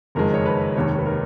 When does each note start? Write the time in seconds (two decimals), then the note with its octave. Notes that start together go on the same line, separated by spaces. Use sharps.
0.15 F#1 F2 D#3 G#3 A#4
0.34 C#5
0.46 B4
0.75 F1 D#2 D#3 G#3 C#5
0.99 B4
1.06 A#4